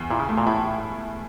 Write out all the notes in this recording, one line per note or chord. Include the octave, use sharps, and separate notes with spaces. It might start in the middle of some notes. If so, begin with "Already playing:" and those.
Already playing: E2
A#2 E4
C#3
A3
A#2
A2 E4